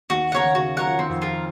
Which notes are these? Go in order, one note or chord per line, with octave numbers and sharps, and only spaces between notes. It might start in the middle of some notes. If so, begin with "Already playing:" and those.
D#2 D#3 F#4
C#3 A#4 C#5 F#5
D#3
C#3 F#4
F#3 A#4 C#5 F#5
F3
D#3 C4
F2 F3
F4 A#4